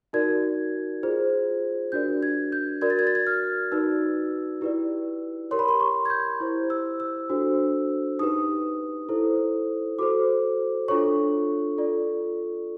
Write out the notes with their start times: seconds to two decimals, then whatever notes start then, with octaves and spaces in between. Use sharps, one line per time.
0.13 D#4 F#4 A#4 D5 G#6
1.03 F4 G#4 C5
1.92 D4 F#4 A#4 D5 G6
2.23 G#6
2.52 G6
2.81 F#4 A#4 D5 G#6
2.90 A6
2.99 G#6
3.07 A6
3.15 G#6
3.27 F6
3.72 D#4 F#4 B4 D5 E6
4.61 E4 G4 B4 D5
5.51 G4 A#4 C#5 C6
5.59 B5
5.68 C6
5.80 C#6
6.06 G#6
6.10 G6
6.40 E4 G4 C5
6.70 E6
7.00 E6
7.29 D4 F#4 A4 C5
8.19 D#4 G4 B4 D#6
9.09 E4 A4 C5
9.99 F#4 A4 C5 D6
10.88 D4 F4 A4 C#5 C#6
11.78 F4 A4 D5